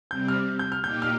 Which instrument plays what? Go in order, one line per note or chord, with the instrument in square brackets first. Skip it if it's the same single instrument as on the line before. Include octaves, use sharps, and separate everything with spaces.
[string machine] C3 G3 C4 [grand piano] G6
[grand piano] F6
G6
F6
[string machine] A#2 A#3 D#4 G4 [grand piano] G6
[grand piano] F6